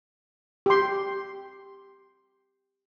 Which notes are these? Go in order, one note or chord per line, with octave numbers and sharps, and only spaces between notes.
G4 C6